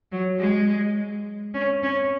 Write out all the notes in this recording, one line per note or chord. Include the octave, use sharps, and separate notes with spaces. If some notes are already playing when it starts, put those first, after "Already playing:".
F#3
G#3
C#4
C#4